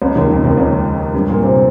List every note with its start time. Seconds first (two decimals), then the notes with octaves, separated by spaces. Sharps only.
0.02 C#2 C#3
0.15 D#2 D#3
0.30 F2 F3
0.44 D#2 D#3
0.58 C#2 C#3
1.14 G2 G3
1.28 A#2 A#3
1.42 C3 C4